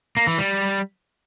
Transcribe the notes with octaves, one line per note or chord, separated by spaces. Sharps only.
A#3
E3
G3